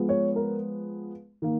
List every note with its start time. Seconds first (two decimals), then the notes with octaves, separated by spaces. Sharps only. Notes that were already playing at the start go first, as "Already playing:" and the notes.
Already playing: F3 G#3 B3
0.09 C#5
0.36 A#4
1.42 D#3 A#3